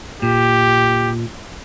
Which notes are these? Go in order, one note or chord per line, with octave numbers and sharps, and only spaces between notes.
A#2 G4